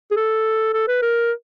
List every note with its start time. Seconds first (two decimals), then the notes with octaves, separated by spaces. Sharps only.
0.12 G#4
0.17 A4
0.74 A4
0.88 B4
1.02 A#4